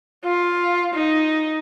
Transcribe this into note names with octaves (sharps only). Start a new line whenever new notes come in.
F4
D#4